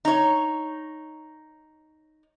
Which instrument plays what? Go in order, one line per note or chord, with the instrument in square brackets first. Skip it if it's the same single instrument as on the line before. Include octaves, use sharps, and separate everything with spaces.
[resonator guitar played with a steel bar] D#4 C#5